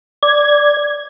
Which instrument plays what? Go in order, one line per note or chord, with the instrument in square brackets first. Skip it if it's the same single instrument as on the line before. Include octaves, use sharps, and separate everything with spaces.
[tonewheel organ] D5 G#6